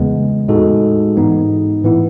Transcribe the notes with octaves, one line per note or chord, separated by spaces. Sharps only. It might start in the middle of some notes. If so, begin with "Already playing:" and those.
Already playing: E2 C#3 G#3 B3
A2 G#3 D#4 F#4 A4
G#2 E3 B3 D#4
A2 E3 B3 E4